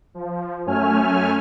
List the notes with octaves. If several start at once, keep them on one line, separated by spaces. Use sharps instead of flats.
F3
F#2 A3 C#4 G#5 F6